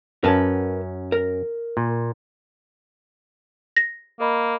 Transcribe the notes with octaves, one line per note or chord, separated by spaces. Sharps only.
F#2 C#4 A#4 B4 A5
A#4
A#2
A#6
A#3 A#4 D#5 B5